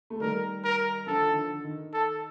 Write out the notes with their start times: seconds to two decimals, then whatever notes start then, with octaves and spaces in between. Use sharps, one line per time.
0.10 A3
0.20 D#3 G3 A#4
0.64 A#4
1.07 D3 F3 A4
1.28 D#3
1.36 D3
1.65 D#3
1.94 A4